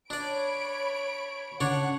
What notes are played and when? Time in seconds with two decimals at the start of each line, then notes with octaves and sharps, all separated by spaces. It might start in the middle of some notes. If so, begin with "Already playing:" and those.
0.10 D4 C#5 D5 B5 D7
1.60 C#3 D4 C#5 D5 F#5